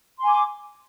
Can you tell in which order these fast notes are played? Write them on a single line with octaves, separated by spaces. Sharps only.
C6 G#5 D6